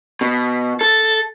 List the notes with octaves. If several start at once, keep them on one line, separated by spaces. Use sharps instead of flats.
B2
A4 A6